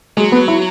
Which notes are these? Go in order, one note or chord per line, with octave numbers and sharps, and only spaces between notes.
F#3 G#3
B3
E4